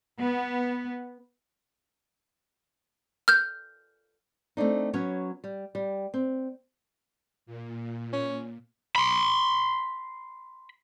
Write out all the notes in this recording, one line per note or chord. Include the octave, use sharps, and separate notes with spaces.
B3
F6 G6
A3 C4 D4 D#4
F#3 B3 C#4 C#5
G3
G3
C4
A#2
C#4
B5 C6